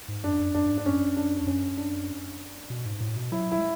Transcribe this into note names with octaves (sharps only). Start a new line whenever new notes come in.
G#2
F#2 D4
F#2
F#2 D4
F#2
G#2
D4
F#2 C#4
D4
E2 D4
F#2 C#4
D4
B2
G#2
A2
B2
F#3 E4
E4
G#3